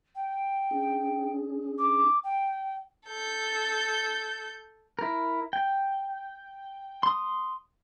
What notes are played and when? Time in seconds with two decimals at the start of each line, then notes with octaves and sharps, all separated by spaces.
0.14 G5
0.71 C#4 D4 G#4
1.77 D6
2.23 G5
3.07 A4 G6
4.99 E4 A#4
5.53 G5
7.03 C6 D#6